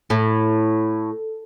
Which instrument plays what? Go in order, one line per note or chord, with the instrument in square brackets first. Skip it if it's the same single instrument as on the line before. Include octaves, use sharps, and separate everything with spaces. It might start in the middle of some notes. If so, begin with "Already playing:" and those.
[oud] A2